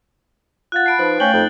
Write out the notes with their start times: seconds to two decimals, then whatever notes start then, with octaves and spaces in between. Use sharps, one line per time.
0.72 F4 F5 F#5 F#6 A6
0.86 A5 B5 C7 D7
0.99 F3 D#4 B4 C5
1.20 A3 C#4 F5 G5 F#7 G7
1.33 F2 D#4